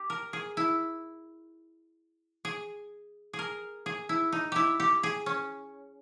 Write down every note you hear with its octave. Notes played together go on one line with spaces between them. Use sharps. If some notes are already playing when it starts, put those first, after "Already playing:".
Already playing: G4
A#4
G#4
E4
G#4
G#4
A#4
G#4
E4
D#4
E4 G4
G4
G#4
C#4